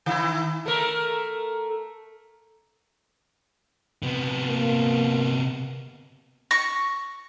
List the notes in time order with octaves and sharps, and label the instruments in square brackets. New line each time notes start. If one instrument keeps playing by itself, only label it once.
[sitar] D#3 E4
A3 A#4
[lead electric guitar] C3 B3
[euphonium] A#3
[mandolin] C#6 [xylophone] A#6